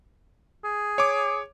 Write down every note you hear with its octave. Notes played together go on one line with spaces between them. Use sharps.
G#4
C#5 D6